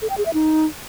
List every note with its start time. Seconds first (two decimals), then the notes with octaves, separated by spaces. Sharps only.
0.02 A4
0.10 G5
0.18 G#4
0.26 E5
0.34 D#4